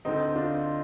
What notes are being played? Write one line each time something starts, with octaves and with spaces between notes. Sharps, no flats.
D2 D3 C4 D#4
D4 F4